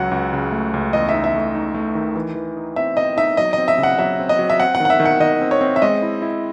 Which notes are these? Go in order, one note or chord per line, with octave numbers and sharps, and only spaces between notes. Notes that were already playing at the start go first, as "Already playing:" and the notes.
Already playing: C#2 F#3 F#5
C#2
C#3
A3
C#2
E2 D#5
E5
D#4
E5
A3
D#4
A3
D#3
E3
E3
D#4
C4 E5
C4 D#5
D#4 E5
F#3 D#5
C4 D#5
E5
C#3
F#5
F#3 E5
C4
D#5
F#3
E5
C4 F#5
F#5
D#3
F#5
E5
D#3
F#5
D#3 D#5
C4
C#5
C4
E5
G#3 D#5
E4
E4